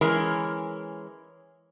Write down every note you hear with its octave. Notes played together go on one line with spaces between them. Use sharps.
E3 G#3 C#4 A#4